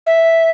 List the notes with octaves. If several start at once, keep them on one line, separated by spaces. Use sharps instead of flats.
E5